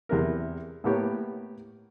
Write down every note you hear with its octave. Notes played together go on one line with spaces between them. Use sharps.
E2 C3 A#4
A2 A#3 B3 G4 C#5